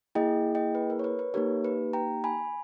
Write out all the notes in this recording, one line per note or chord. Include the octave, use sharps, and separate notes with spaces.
A#3 E4 G#4 D#5 G5
D#5 G5
B4
A#4
C#5
B4
B4
A#3 D#4 G4 A#4 C#5
B4
G5 A#5
G#5 B5